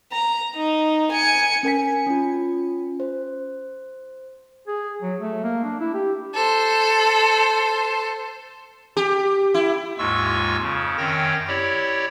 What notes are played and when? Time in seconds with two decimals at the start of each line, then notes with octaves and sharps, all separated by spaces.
0.12 A#5
0.56 D#4
1.12 G#5 C#7
1.63 C#4 A#4 G#5 B6
2.06 C#4 F4
3.00 C5
4.68 G#4
5.02 F#3
5.21 A3
5.44 A#3
5.64 D4
5.80 E4
5.94 G4
6.34 A4 C5
8.97 G4
9.54 E4
9.98 D#2 G#2 G#3 F4 C#6 E6
10.62 F2 C#3
10.98 F#2 D#3 C4 C#5 G5 A#6
11.48 E4 G4 C#5 D5